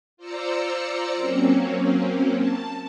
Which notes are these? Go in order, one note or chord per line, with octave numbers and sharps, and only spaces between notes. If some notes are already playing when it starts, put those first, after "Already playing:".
F4 C5 D5 A#5 E6 C#7
F#3 A#3 C4 C#4
A5